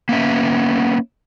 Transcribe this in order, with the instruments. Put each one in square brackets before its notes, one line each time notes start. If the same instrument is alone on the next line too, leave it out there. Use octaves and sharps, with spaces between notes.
[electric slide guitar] A#3 B3 C#4 E5